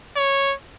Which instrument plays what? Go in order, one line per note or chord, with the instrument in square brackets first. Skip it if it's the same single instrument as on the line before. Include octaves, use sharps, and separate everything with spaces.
[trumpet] C#5